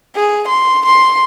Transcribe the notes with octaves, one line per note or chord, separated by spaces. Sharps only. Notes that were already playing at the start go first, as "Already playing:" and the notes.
G#4
C6
C6